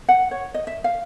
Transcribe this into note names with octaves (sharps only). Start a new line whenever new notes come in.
F#5
C#5
D#5
E5
F5